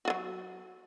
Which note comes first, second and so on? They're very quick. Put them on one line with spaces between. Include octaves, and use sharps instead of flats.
F#4 F4 F#3